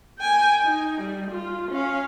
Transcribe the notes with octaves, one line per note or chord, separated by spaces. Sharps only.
G5 G#5
D#4
G3
F4
C#4 F5